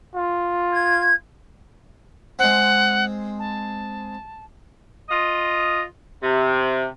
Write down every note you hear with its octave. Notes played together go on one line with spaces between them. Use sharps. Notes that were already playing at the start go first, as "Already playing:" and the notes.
F4
G#6
G#3 C4 F#5
A5
F4 D#5
C3